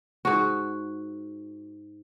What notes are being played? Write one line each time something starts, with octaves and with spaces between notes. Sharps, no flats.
G#2 F#4